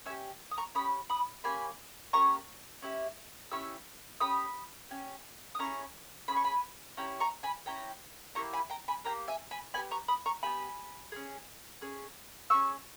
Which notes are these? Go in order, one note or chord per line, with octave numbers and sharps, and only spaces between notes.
C#4 G4 E5 G#5
D#6
A#5 C#6
C#4 G4 B5 D#6
B5 D#6
A#3 C#4 G4 G#5 B5
A#3 C#4 G4 A#5 C#6
C#4 E4 G4
C#4 E4 G4 C#6 E6
C#4 G4 B5 D#6
C#4 G4
D#6
C#4 E4 G#4 A#5 C#6
C#4 E4 G#4 B5
C#6
G#5 B5
C#4 E4 G4 G5 A#5
A#5 C#6
G#5 B5
C#4 E4 G4 G5 A#5
A#3 E4 G4 A#5 C#6
G#5 B5
G5 A#5
G#5 B5
A#3 E4 G4 G5 A#5
E5 G#5
G#5 B5
B3 G4 G#5 B5
A#5 C#6
B5 D#6
A#5 C#6
B3 G4 G#5 B5
C#4 G#4
C#4 G#4
C#4 G#4 C#6 E6